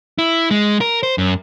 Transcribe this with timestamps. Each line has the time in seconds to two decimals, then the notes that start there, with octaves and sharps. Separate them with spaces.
0.18 E4
0.51 G#3
0.81 A#4
1.03 C5
1.18 F#2